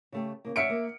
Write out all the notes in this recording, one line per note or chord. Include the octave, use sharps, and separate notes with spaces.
C#3 A3 G4
C#3 A#3
D2 C#5 E5 F#5 C#7 D7
A#3